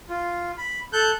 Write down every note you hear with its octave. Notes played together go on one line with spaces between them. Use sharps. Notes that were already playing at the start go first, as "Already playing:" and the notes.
F4
B5
A4 F#6 G6